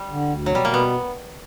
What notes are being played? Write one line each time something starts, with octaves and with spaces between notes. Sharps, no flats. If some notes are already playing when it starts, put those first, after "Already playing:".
Already playing: G3
D3
D2
B2 F#3
G3
B2 A#3
B3